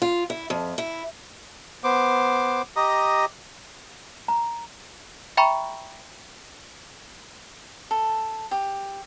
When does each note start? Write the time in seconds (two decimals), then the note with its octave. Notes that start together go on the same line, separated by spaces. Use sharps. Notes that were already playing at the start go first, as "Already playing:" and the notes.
0.02 F4
0.30 E4
0.50 F2
0.78 E4
1.84 B3 C5 D6
2.76 G4 D#5 A#5 D#6
4.28 A#5
5.37 E5 G5 A#5 B5 C#6
7.91 A4
8.51 G4